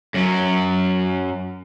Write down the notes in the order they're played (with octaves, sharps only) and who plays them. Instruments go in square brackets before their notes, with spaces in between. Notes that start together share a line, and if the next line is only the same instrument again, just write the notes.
[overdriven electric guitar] F#2 F#3